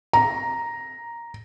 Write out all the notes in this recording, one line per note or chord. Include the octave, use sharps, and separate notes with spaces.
A#5